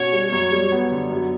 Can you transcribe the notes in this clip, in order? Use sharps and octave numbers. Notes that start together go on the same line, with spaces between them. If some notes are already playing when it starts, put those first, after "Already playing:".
Already playing: B2 C#4 F#4 C#5
G3
F#2 C#5
G3
B3
D3
F#2